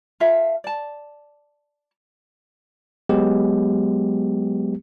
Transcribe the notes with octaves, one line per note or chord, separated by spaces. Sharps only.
F4 A4 E5 F5
D5 A5
F#3 G#3 B3 G4